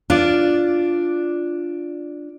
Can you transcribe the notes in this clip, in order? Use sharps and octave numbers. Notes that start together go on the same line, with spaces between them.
D4 F4 D5